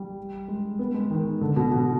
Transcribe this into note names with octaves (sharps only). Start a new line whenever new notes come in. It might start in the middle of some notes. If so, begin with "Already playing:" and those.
Already playing: G3
G#3
B3
G#3
D#3
D3
B2
B2